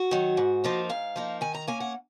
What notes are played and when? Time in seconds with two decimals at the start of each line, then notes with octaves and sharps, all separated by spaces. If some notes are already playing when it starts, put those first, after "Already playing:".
Already playing: F#4
0.11 D#3 F#3
0.37 G#2
0.64 F3 A#3 D#4
0.89 G#2 F5
1.16 F3 A#3 D#4
1.41 D#3 G#5
1.54 A#5
1.67 A#3 C#4 G#5
1.80 F#5